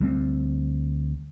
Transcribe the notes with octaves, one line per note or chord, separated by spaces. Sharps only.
D2 G3 A3 C4